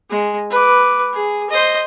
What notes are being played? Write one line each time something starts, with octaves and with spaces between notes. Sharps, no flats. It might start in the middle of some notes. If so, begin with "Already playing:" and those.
G#3
B4 D6
G#4
C5 D#5